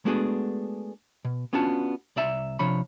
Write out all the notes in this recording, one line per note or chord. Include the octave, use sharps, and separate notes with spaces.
G#3 A3 B3 D4 F#4 G#4
B2
B3 C#4 D4 F4 F#4 A5
C2 D5 E5 A#5
C3 F3 D4 C#5 B5